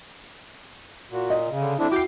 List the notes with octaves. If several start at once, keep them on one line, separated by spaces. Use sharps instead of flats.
A#2 F#4
D#5
C#3
D3
F2 C4 D4 E4
F#4 G5 D6 C7